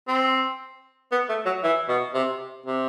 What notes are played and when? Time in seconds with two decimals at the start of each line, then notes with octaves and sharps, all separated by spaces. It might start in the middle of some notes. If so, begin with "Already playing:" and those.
0.08 C4
1.12 B3
1.29 A3
1.46 F#3
1.63 E3
1.89 B2
2.14 C3
2.66 C3